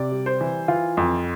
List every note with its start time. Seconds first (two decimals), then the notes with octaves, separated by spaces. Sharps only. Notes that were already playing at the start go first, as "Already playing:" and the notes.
Already playing: C3 D5
0.12 G3
0.26 C5
0.41 E3
0.68 E3 F4
0.97 F2